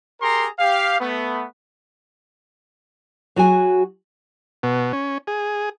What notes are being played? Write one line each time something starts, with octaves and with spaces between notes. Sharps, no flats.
G4 G#4 A#4 A#5 C6
G4 F5
A3 B3
F#3 F#4 G#4 G#5
B2
C#4
G#4